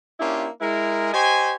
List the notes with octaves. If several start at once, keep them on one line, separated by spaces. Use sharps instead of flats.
A#3 C#4 D4 E4 F4 G4
G#3 E4 A#4
G4 C5 C#5 D#5 G#5